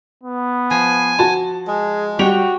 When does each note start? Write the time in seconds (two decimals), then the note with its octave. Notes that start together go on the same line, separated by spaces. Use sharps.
0.23 B3
0.71 F3 G#5
1.19 F#4 A5
1.68 G#3 G#4
2.19 G3 F#4 G4 C#5 G5 F7